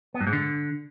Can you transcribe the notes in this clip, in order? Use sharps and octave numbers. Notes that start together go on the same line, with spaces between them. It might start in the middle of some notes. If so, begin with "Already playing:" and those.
B3
G2
G#2
D3